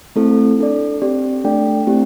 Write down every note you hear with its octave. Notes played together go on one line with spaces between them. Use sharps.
A3 C4 E4 A4
D4 A4 D5
C4 G4 D5
A3 D4 A4 D5 G5
A3 C4 E4 G4